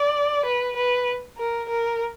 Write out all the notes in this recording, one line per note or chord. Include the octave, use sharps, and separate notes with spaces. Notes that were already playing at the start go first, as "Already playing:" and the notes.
Already playing: D5
B4
B4
A#4
A#4